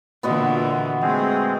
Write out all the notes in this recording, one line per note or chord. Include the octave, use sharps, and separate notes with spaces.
A#2 D3 E3 B3 F#4 D#5
G#3 A3 C4 G#4